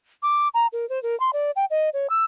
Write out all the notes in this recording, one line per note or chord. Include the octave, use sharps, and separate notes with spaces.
D6
A#5
A#4
C5
A#4
C6
D5
G5
D#5
C#5
E6